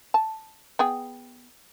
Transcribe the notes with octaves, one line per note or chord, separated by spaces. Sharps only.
A5
B3 G#4 G5